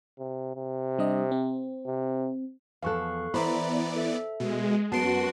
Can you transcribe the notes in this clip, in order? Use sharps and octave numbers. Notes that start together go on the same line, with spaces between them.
C3
C3
G3 D4 D#5
C4
C3
E2 F3 A4 F5 C#6 F#6
E3 B3 C5 D5 E5 A#5 B5
A4 E5
B2 G#3
F#2 B3 F#4 A5 C6 C7 D7